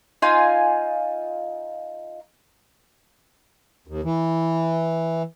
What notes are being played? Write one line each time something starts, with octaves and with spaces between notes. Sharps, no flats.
D#4 F4 G#5
D#2
E3